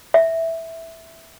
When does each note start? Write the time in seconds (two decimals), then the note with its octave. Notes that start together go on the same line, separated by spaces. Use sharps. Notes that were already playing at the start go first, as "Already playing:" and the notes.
0.14 E5